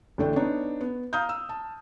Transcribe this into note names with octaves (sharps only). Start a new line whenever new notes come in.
A1 D3 A3 D4 G5
B3 D4 D#4 C#5
B3
F5 A#5 D#6 F6 G6
E6
A5